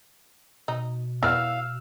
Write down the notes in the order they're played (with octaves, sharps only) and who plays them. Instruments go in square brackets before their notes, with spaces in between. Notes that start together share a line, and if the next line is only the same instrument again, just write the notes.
[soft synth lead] B2 [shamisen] D#4
[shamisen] E3 B3 D5 [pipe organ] F5 [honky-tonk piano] E6 F6